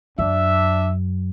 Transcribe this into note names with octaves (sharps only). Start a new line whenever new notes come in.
F#2 D4 E5